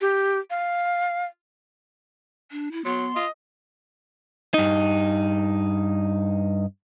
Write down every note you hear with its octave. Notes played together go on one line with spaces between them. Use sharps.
G4
F5
D4
E4
F#3 B3 C6
F4 D#5
G2 D#4